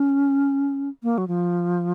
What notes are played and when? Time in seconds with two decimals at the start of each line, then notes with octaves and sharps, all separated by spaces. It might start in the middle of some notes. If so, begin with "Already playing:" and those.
Already playing: C#4
1.03 A#3
1.18 F#3
1.28 F3